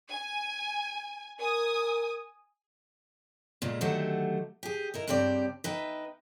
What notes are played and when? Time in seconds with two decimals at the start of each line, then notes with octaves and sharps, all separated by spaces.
0.12 G#5
1.40 A#4 G#5 D#6
3.62 A#2 C#3 G#3 A3
3.81 D3 D#3 F#3 A3 G4 F#5
4.63 G4 G#4
4.94 D#4 E4 A#4
5.07 G2 C#3 C4 G4 D5
5.64 D#4 B4 E5 G5